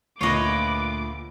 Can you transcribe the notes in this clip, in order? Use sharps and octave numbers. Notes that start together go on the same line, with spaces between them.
D2 A#2 F4 B4 C#5 D#5 D6